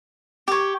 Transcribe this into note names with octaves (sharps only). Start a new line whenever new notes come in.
G4 C#5